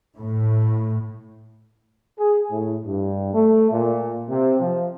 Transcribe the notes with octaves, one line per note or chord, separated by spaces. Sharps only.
A2
G#4
A2
G2
A3
A#2
C3
F3